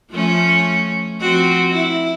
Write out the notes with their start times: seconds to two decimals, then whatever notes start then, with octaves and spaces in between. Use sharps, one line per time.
0.11 F3 A3 C#4
1.20 F3 C4 F#4
1.71 E4